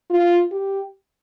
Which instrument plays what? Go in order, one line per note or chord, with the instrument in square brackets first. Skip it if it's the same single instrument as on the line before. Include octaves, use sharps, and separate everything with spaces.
[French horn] F4
G4